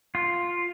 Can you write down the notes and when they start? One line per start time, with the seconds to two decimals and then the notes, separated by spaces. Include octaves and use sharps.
0.15 F4